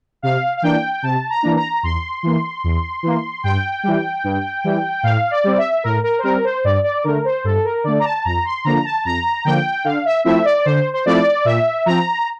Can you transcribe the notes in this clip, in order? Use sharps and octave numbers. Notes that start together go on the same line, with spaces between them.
C3 F5
F5
E3 A#3 D4 G5
C3 A5
A#5
E3 A#3 D4
A#5
E2 C6
E3 A#3
E2
E3 A#3
G2 G5
E3 G3
G2
E3 G3
A2 F5
D5
G3 C4
E5
A2 A#4
A#4
C5
G3 C4 A#4
C5
G2 D5
D5
D3 A3 A#4
C5
G2 A4
A#4
D3 A3 D5
A#5
A5
F2 A#5
C6
D3 F3 A#3 A#5
A5
F2 A#5
D3 F3 A#3 G5
D3 F5
E5
F3 A3 C4 E4 E5
D5
D3 C5
C5
F3 A3 C4 E4 D5
A#2 E5
F3 C4 A#5